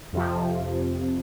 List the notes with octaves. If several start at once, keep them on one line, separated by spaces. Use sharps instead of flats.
F2 C3 F3